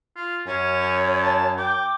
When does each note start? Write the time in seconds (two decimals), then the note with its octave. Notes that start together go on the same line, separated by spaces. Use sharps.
0.16 F4
0.47 F#2 C#4 C#5
1.23 A5
1.57 G5 D6